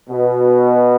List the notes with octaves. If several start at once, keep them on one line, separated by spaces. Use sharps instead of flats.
B2